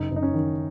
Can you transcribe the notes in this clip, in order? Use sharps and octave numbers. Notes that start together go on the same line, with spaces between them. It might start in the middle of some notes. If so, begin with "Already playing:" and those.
Already playing: F#1 D#4
F#1 D#4
C#4
D#3